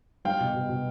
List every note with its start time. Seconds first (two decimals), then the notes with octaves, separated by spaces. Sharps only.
0.25 G3 F5 G5
0.40 B2
0.54 B2
0.69 B2